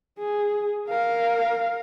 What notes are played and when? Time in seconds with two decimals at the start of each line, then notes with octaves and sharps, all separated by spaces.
0.18 G#4
0.89 A#4 F5